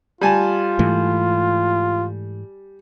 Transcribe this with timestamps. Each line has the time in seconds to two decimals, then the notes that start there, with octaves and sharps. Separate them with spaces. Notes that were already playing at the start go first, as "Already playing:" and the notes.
0.21 G3 F4 G#5 A5
0.79 G#2 E3 A3